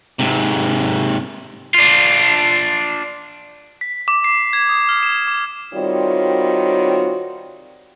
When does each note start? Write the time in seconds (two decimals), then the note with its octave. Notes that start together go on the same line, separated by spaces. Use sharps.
0.19 G#2 C3
1.74 D4 F4
3.81 B6
4.08 D6
4.24 C7
4.53 G#6
4.69 D#6
4.89 F6
5.03 E7
5.27 D6
5.73 D#3 G3 C4 F4 F#4 C#5